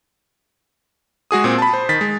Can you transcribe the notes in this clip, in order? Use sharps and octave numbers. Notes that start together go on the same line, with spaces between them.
G#3 F#4 G#4 D#6
A#2 C4
A5 B5
C5
D#3 A6 B6
G#3